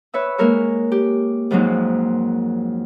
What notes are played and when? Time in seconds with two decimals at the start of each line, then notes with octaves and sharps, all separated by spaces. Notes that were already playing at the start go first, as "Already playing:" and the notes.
0.14 B4 C#5 E5 E6
0.38 G#3 A#3 D#4 A#4 C#5 E5
0.92 G4
1.51 F2 G#2 F3 F#3 A#3 D#4